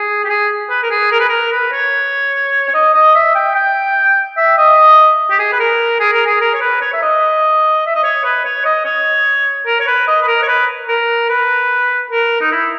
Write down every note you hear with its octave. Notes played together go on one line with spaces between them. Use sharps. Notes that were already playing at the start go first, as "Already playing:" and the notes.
Already playing: G#4
G4
G#4
B4
A#4
G#4
A#4
B4
A#4
B4
C#5
C#5
D#5
D#5
E5
G5
G5
E5
D#5
G4
G#4
B4
A#4
G#4
A#4
G#4
A#4
C#5
B4
C#5
E5
D#5
E5
D#5
C#5
B4
C#5
D#5
C#5
A#4
C#5
B4
D#5
B4
A#4
C#5
B4
A#4
B4
A#4
D#4
E4